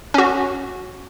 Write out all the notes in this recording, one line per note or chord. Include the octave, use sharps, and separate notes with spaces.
C#4 F#4